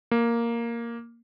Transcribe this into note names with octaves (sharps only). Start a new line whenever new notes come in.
A#3